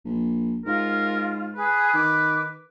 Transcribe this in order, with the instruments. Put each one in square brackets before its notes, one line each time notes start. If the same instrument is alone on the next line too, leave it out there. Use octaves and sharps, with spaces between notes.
[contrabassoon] A#1
[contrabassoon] G#2 [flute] F4 [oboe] A#4
[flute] G#4 [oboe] B4
[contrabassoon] D#3 [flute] D6